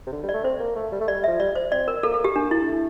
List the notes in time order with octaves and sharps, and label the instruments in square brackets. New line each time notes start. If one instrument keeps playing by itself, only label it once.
[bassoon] C3
D3
G3
[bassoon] A3 [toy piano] D5
[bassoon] C4 [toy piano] C5
[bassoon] A#3
A3
G3
A3
[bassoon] G3 [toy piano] D5
[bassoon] F3 [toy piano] E5
[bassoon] G3 [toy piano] D5
[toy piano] C5
[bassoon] C4 [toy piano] D5
[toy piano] A#4
[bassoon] A#3 [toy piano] A4
[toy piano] A4
G4
[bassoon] A#3 [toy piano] D4
[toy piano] E4
[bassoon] A3